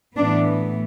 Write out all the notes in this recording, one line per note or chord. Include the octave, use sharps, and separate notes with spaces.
A2 E3 B3 D4